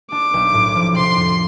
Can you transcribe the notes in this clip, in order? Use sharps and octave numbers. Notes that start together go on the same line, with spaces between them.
D4 D6
B1
A2
F3
C3 C6
F2